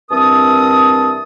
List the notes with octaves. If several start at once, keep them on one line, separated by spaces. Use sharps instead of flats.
G2 E3 C4 A#4 A5 D#6